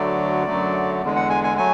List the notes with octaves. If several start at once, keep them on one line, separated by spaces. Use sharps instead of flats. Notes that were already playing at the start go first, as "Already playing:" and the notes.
Already playing: D2 D3 F#3 A3 D5
F#2 D3 F#3 A3
E2 D3 G#3
F#5
G#5
G#5
F#3 A3 G#5